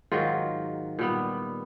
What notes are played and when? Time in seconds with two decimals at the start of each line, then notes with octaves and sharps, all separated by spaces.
0.12 G#2 D#3 F#3 F4
0.99 A#2 G3 B3